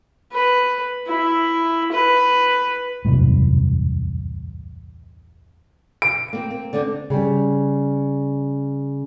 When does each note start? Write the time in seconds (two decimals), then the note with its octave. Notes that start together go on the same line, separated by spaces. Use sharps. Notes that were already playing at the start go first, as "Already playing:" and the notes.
0.32 B4
1.07 E4
1.92 B4
3.05 E1 C2 F#2 A2
6.02 D7
6.33 A#3 C4
6.51 C4
6.73 D3 C4 D4
7.10 C#3 G3